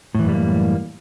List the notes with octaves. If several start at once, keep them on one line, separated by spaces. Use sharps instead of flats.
F#2 A2 E3 G3 A#3